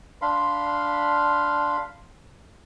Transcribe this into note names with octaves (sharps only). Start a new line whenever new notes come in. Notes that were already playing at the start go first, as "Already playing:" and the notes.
D4 F5 B5 C6